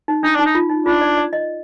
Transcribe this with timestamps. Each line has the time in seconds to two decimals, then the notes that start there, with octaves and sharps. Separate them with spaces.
0.08 D#4
0.23 D4 D#4
0.35 D4 D#4
0.46 D#4
0.55 F4
0.69 D#4
0.86 D4 F4
1.01 D5
1.17 D5
1.33 D#5